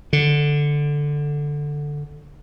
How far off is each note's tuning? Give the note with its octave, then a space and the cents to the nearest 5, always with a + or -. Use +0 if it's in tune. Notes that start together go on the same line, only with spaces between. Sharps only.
D3 +0